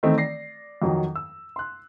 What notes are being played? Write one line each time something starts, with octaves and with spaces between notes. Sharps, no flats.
D#3 E3 A3 C4 D#4
D5 A#6 C7
F2 D#3 F#3
E6
C6 F#6